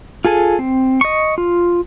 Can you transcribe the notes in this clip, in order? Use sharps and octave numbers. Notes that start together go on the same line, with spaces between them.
F4 G#4 A4 G#5
C4
D#5 C#6
F4